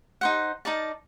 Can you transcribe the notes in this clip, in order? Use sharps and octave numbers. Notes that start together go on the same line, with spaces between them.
D#4 C5 F#5
D#4 A#4 D5 A5